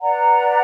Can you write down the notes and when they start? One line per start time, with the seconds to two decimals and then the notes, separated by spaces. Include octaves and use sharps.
0.01 B4 D5 F#5 A#5